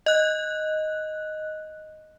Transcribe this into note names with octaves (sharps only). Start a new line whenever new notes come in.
D#5 F#6